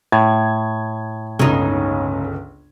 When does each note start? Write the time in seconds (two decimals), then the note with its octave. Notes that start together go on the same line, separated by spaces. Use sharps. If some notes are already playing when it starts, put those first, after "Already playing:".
0.12 A2 G#6
1.39 G1 C#2 C#3 D#4